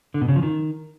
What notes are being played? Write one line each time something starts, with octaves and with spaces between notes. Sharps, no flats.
D3
B2
C#3
F3
D#3